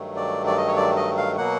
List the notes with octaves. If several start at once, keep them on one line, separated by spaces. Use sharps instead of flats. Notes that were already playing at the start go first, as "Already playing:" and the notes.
Already playing: G2 D#3 F#3 A3
D5
D5
D#5
C#5
D5
D#5
F5
B2 F#3 A#3 F#5